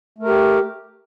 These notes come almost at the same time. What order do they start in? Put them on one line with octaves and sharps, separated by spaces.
A3 A#4 G4